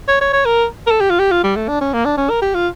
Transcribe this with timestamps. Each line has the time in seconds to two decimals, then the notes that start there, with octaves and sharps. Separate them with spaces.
0.08 C#5
0.21 C#5
0.33 C#5
0.45 A#4
0.87 A#4
0.91 A4
1.00 G4
1.10 F4
1.19 G4
1.31 F4
1.43 G3
1.56 A3
1.68 D4
1.81 C#4
1.93 A#3
2.05 D4
2.17 C#4
2.29 A#4
2.42 G4
2.55 F4